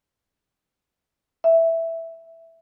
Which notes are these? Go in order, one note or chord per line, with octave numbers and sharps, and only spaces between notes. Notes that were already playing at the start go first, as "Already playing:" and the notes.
E5